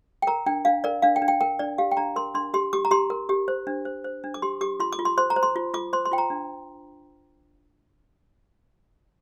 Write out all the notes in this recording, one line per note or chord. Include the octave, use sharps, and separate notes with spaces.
G5
A#4 A#5
D4 G5
D4 F5
A#4 D5
D4 F5
G5
D4
G5
A#4 G5
D4 D5
G4 F5
G5
D4 A#5
A#4 C6
D4 C6
G4 C6
G4 D6
A#5
G4 C6
A#4
G4
C5
D4
C5
C5
D4
D6
G4 C6
G4 D6
F4 C6
D6
F4
C6
C5 C6
A#5
C5
C6
F4
F4 D6
C5 C6
C6
F4 G5
A#5
D4